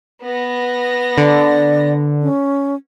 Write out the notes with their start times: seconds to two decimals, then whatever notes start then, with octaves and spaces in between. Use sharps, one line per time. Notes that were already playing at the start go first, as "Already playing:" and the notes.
0.24 B3 A#6
1.18 D3 D5
2.21 C#4